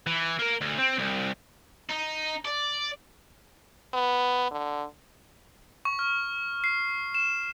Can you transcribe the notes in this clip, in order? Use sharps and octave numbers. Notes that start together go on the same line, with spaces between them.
E3
A#3 A#4
D2
C4
C2
D#4
D5
B3
D3
C#6
F6
C7
E7